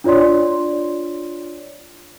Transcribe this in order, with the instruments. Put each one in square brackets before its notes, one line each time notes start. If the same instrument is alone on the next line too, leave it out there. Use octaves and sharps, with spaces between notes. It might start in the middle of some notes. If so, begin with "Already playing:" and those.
[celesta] D4 F4 C#5 D5 C6